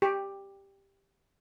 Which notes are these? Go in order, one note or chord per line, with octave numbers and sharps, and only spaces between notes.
G4